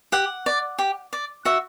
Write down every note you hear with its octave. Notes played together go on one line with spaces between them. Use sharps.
G4 F#5
D5
G4
D5
F#4 E5